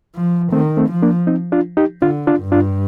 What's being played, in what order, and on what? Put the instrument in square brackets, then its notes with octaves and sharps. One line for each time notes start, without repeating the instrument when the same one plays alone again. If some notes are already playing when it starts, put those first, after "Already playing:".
[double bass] F3
[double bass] D#3 [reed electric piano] A3 C4
[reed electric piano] A3 C4
[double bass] F3
[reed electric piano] A#3 D4
C4 D#4
D4 F4
D#4 G4
[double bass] D3 [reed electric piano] D4 F4
[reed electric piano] D4 F4
[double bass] G2
[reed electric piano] D4 F4